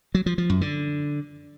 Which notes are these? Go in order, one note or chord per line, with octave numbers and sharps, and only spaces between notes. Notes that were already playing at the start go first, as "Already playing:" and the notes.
F#3
F3
F3
F#2
D3